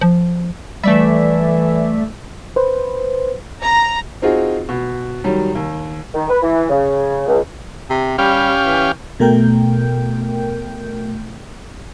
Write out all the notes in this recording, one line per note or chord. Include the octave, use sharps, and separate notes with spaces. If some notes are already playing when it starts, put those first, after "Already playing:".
F3
E3 G3 A3 D5 E5
B4 C5
A#5
C4 D#4 F4 F#4 G#4
B2
D#3 F#3 G3
D#2
D#3
B4
E3
C#3
C#2
C3
G3 C#4 G4 F5
E3
B2 A3 A#4 G5 G6